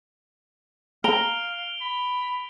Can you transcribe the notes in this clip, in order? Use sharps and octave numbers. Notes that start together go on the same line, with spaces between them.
F5 A#5 D7 F7 G7
B5